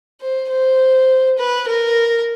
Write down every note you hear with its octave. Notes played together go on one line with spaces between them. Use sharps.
C5
C5
B4
A#4